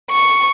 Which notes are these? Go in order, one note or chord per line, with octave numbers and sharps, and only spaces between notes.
C#6